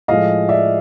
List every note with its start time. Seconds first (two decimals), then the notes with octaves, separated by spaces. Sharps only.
0.08 A2 F3 G#3 D#5 F5
0.49 D5 E5